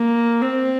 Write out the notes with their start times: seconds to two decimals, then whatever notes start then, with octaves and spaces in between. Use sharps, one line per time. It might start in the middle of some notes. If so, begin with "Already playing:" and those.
Already playing: A#3
0.42 C4